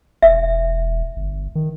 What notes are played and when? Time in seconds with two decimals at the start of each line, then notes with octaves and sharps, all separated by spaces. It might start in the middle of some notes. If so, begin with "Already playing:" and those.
0.22 E1 E5
1.16 G1
1.55 D#3